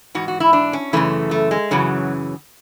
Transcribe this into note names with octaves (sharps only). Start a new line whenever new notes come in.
G#2 E3 F#4
F#4
E4
D4
C#4
F#2 C#3 E3 A3
A3
G#3
F#2 C#3 E3 F#3